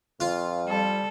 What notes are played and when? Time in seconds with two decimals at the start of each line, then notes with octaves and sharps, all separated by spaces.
0.20 F2 F4
0.67 G3 A4